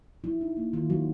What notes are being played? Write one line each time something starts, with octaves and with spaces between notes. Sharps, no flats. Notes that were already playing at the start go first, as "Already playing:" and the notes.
F#3 E4
D#4
A#3
D#3 F4
F#3 F#4